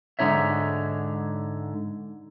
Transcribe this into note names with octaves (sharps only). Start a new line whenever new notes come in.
G#2 D3 D#4 C#5 E5